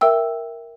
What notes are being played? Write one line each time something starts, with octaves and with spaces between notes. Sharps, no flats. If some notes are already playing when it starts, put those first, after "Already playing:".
A#4 E5 G5 E6